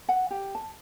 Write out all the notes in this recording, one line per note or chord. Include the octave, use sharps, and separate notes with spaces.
F#5
G4
A5